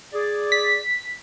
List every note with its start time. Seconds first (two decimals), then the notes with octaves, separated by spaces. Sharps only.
0.13 G#4 D5
0.52 B6